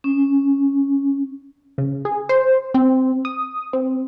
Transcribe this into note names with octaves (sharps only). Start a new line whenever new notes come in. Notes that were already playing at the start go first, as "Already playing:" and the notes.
C#4
C#3
G#4
C5
C4
D#6
C4